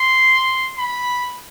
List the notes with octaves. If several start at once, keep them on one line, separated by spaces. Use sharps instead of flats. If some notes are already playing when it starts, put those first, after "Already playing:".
Already playing: C6
B5